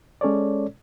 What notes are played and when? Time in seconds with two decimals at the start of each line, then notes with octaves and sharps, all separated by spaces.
0.21 G#3 C#4 A4 C#5 D5